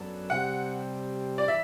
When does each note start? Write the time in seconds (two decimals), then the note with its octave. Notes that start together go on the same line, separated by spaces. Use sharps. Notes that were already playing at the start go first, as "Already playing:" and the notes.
Already playing: F#2 F#3 B3 D4 A4
0.30 C3 G3 C4 F#5
1.38 D5
1.48 E3 E5